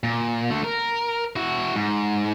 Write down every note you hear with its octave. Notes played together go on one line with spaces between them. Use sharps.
A#2
D3 A3
A#4
E4 F#4
G#2